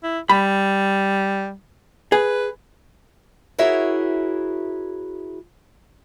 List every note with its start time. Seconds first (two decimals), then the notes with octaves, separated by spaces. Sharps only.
0.04 E4
0.30 G3 B5
2.12 G#4 B4
3.58 E4 F#4 G#4 A#4 C#5 E5